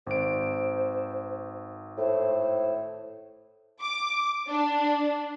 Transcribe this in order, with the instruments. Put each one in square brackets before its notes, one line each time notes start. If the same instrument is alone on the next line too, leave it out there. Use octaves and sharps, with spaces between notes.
[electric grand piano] G#1 D7 [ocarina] C5
[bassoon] A2 [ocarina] C5
[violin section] D6
D4